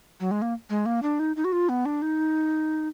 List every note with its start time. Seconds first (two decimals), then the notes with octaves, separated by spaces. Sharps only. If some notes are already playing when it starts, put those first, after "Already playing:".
0.20 F#3
0.31 G#3
0.42 A#3
0.70 G#3
0.86 A#3
1.02 D4
1.19 D#4
1.36 D#4
1.44 F#4
1.52 F4
1.69 B3
1.85 D4
2.02 D#4